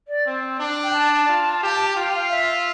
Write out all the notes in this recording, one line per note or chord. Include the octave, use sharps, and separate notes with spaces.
D5
C4
D4
G5
A5
F4
G4
F4 G5
F5
E5